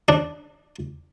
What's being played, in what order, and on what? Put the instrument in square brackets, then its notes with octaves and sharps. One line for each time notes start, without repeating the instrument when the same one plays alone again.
[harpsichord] D4